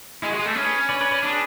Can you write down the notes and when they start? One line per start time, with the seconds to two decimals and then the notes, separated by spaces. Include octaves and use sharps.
0.22 G#3 E4
0.30 F#4
0.34 G#3
0.39 G#4
0.46 A3 A4
0.55 C#4 G#4 B4
0.89 B4 D5
1.01 B4 D5
1.11 B4 D5
1.22 D4 G#4 B4